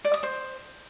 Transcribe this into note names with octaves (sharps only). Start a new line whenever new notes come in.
D5
D#6
C5